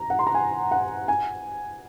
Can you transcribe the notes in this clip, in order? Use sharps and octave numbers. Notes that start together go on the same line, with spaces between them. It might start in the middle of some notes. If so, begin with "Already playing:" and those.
Already playing: A#5
F#5
C6
A#5
G#5
F#5
G#5